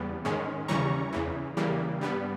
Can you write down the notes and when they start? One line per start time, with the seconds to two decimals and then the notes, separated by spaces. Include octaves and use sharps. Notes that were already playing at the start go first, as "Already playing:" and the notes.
Already playing: E2 C#3 G3 B3
0.25 G#2 D#3 G#3 C#4
0.68 D#2 C#3 E3 G3 C#4 A#5 C#6
1.13 E2 C#3 E3
1.57 C#3 E3 G3 A#3
2.01 G2 G3 B3